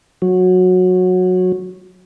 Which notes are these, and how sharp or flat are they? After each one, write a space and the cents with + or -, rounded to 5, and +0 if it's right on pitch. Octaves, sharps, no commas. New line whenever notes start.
F#3 -15